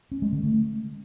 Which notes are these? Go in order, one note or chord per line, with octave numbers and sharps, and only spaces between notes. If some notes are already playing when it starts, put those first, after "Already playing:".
C#4
G#3
D3
A3